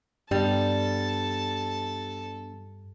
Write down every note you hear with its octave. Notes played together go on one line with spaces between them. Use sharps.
G2 G3 B3 D4 A4 A5